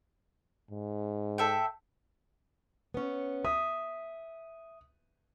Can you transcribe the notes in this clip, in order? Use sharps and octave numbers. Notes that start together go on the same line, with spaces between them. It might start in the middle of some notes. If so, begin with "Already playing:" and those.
G#2
A4 E5 G5
B3 C#4
E5 D#6